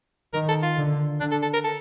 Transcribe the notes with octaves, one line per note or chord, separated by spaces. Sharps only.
D#3 A#4
A4
F4
D3
D3 D4
A4
A4
A#4
A4